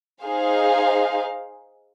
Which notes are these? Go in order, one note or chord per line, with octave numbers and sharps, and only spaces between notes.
D#4 G#4 C5 F5